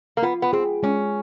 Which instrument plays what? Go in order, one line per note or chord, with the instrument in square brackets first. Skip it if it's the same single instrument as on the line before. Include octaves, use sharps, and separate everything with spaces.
[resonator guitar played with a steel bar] A#3
[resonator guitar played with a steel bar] B3 [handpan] F4
[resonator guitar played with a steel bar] B3
[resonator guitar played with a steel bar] C4 [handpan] G#4
[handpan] G#3 [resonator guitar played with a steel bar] C#4